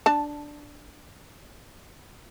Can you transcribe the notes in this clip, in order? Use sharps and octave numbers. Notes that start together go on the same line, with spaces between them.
D4 A5